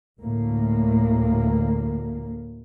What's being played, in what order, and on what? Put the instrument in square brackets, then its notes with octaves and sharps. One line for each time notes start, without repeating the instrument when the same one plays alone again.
[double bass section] D2 A2 A#3